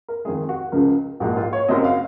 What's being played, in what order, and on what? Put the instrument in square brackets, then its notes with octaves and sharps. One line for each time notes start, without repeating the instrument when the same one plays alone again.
[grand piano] A#4
F2 D#3 G#3 G#4
G#4
F#4
C#2 C#3 F3 A#4
A#1 G#2 F3 A#3 F#4
F4
C#5
F#1 F#2 C#3 F#3 C4 D#5
F5